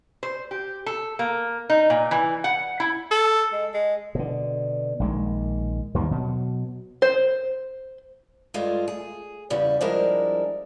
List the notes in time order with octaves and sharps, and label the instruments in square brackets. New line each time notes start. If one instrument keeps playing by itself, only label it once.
[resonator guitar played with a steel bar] C5
G4
A4
A#3
D#4
A#2
E3
F#5
E4
[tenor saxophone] A4
G#3
G#3
[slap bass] B2 D3
A#1 D#3 G#3
D#2 D#3 G3
B2 F#3
[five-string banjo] C5
[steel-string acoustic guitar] G2 G#3 A3 F4
G#4
E2 C#3 G3
F3 G3 G#3 D4 E4 A#4